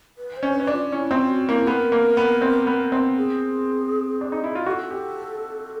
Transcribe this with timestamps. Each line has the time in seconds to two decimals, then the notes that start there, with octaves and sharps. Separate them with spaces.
0.18 B4
0.37 C5
0.43 C#4
0.55 C#4 B4
0.67 D4
0.74 F4
0.92 C#4 E4
1.11 C4 F4
1.30 F#4
1.49 A#3 E4
1.67 B3 A#4
1.92 A#3
2.17 B3
2.41 C4
2.67 B3
2.92 C4
3.16 G#4
4.21 D4
4.32 D#4
4.44 E4
4.55 F4
4.66 F#4 A4
4.91 G4